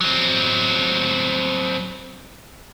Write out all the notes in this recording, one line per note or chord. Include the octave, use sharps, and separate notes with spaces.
F#3 C4